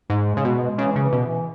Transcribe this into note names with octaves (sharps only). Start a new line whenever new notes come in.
G#2 G#3
C#3 G#3
B2
G#3
C#3 E3
C#3
E3
B2
E3